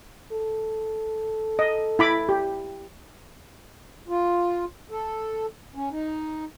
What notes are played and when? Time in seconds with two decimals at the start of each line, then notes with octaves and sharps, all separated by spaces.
0.32 A4
1.59 D#5
1.99 E4 B5 D6
2.29 G4
4.08 F4
4.91 A4
5.75 C#4
5.92 D#4